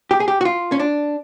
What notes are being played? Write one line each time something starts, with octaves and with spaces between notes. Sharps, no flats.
G4
G#4
G4
F#4
F4
C#4
D4